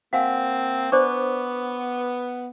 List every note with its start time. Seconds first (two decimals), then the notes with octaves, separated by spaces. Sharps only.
0.13 A#3 C4 F#4 F5 F#5 G#5
0.92 B3 D4 C5 D5 C#6 D6